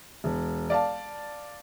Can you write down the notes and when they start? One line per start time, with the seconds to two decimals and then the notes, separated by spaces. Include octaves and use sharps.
0.24 E1
0.70 D5 F5 A5